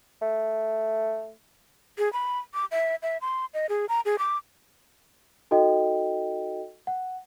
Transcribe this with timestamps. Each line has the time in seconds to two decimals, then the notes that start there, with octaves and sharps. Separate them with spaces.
0.21 A3
1.98 G#4
2.13 B5
2.54 D6
2.71 E5
3.03 E5
3.21 C6
3.54 D#5
3.69 G#4
3.89 A#5
4.05 G#4
4.19 D6
5.51 D#4 F#4 A4 D#5 G5
6.87 F#5